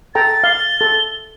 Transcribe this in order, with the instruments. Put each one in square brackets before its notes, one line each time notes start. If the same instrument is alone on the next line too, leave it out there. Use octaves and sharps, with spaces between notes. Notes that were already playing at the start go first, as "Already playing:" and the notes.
[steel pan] A4 G5 A#5 [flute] A6
[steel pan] F5 [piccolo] G7
[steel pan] A4